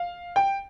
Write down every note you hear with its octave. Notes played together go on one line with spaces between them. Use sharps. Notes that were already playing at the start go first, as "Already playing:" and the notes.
Already playing: F5
G5